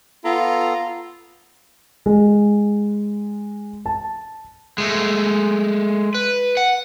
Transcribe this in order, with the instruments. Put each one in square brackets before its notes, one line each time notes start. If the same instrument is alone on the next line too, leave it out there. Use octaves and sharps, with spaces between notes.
[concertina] B3 A4 A#5 [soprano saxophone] F4
[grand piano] G#3
A5
[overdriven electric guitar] G#3 A3
B4
F#5